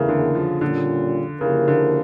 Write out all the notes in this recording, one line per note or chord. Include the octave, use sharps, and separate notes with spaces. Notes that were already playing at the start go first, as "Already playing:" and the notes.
Already playing: E2 C#3 E3 A3 E4 A#4
D3
F3
A#2 D3 G3 C#4 F4
C#3 F3 A#3 E4 G4 A#4
D3